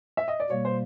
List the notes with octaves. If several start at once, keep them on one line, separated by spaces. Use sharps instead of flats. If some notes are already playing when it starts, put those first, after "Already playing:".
E5
D#5
D5
B2 G3 A#3 C#5
C5